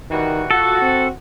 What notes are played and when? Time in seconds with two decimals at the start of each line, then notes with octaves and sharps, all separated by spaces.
0.10 D#3 E3 G3 F#4
0.51 F4 F#4 A4
0.81 C4